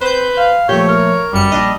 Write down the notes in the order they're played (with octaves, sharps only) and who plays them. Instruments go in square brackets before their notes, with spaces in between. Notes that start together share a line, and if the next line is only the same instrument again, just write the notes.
[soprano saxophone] C4 [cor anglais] B4 [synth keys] C5 G6
[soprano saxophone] F5
[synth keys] A#2 F3 A3 [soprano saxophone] G4 [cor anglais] C#5
[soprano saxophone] A#4
[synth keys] G1 F#2 C#7 [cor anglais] G3
[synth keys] A#1 D4 D#5